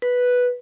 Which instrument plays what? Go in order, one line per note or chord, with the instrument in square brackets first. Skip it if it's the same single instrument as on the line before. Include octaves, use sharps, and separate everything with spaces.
[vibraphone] B4